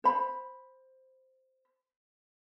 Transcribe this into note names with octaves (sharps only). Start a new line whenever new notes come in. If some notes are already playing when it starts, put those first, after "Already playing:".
C5 B5